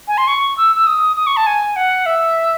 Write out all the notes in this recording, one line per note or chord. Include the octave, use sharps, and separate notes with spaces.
G#5
C6
C#6
E6
E6
D#6
D#6
C#6
A5
G#5
F#5
E5